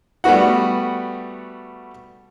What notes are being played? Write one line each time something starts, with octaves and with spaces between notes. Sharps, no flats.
G3 A3 B3 F#4 F#5